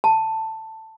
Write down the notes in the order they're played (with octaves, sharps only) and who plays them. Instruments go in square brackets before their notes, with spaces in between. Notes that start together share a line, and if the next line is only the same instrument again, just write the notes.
[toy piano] A5